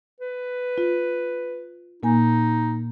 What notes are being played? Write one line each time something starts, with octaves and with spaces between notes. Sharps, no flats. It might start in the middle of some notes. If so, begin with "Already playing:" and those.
B4
F4
A#2 A#3 D#4 G#5